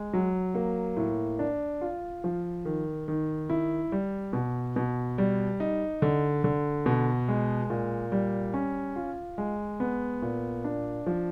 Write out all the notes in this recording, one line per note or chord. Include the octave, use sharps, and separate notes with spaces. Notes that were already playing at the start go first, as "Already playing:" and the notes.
Already playing: G#3
F#3
A#3
A2
D4
F4
F3
D#3
D#3
E4
G3
B2
B2
G3
D#4
D3
D3
B2
G#3
A#2
G3
C#4
F4
G#3
B3
A#2
D4
F3